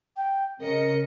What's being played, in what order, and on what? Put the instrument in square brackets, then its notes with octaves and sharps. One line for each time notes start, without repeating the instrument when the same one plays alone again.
[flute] G5
[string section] C#3 D#5 C#7 [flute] A#4